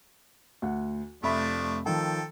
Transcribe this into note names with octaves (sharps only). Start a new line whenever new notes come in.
D2 F#5
F1 F3 A3 D4 E5 B5
D#3 F3 A4 G5